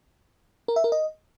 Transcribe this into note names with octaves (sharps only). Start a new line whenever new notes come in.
A#4
E5
A#4
D#5